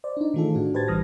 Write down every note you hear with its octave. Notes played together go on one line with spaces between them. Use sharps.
C5 D5
D4 D#4
D#3 E3 A3 F4 G#4 A4
A2 D4 F#4
G4 B4 C5 A5 G#6 A6
B1 E3 G3 D#6 F6 A#6